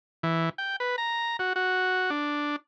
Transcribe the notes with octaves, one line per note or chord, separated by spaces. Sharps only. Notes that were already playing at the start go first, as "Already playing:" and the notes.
E3
G5
B4
A#5
F#4
F#4
D4